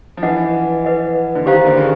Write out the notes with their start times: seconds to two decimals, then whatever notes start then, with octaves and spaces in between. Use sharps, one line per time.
0.17 F3
0.23 E3 B4 D#5 F#5
0.85 B4 D#5 F#5
1.35 D3
1.46 D#3 G4 C5 F5 A#5
1.67 D3
1.77 C#3